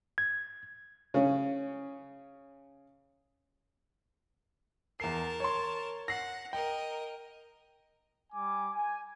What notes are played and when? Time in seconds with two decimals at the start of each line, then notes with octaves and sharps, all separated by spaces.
0.18 G#6
1.14 C#3 C#4
5.00 E2 A#4 A5 C7
5.40 C#5 C6
6.08 F#5 A#6 C7
6.53 A#4 D#5 G5
8.33 G3 G#5 D6
8.72 G#5